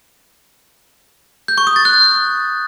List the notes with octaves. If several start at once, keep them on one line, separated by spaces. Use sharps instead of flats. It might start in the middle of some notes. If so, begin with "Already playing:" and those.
G6
C#6
D#6
A6
F#6